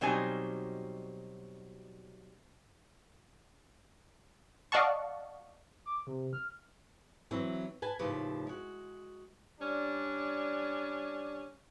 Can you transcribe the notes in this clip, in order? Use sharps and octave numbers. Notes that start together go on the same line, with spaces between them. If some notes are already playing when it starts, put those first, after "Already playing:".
B2 F#3 G3 C4 D#4 G#5
D5 D#5 F5 F#5 A5 C#6
D6
C3
F6
E3 F#3 C4 E4
B4 G#5 A5
D#2 A2 C#3 F3 G4 B4
G#3 F#4
G3 C#4 D4